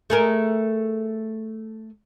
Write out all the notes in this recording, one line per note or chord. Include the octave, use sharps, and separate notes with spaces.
A3 G#4 A#4